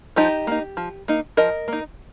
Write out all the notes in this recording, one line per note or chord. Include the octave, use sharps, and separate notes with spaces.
F3 D#4 G4
A#3 D#4
F3
A#3 D#4
F3 A#4 D#5
A#3 D#4